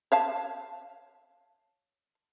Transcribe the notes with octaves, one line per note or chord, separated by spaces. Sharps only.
C#5 F5 A5